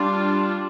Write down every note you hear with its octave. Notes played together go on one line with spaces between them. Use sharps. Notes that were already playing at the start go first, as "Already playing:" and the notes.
Already playing: G3 D4 F4